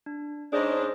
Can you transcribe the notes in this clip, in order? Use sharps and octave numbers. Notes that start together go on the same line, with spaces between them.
D4
G#2 C#4 D4 G#4 C5 D#5